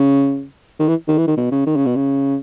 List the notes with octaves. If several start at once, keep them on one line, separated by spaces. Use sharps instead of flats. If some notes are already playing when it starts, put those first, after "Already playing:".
Already playing: C#3
D#3
E3
D#3
E3
D#3
B2
C#3
D#3
C#3
B2
C#3